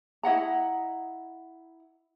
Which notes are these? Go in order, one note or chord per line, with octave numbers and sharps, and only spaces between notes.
E4 D#5 F#5 A#5